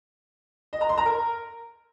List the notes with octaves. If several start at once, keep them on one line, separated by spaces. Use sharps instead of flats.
D#5
A#5
C6
A#5
A#4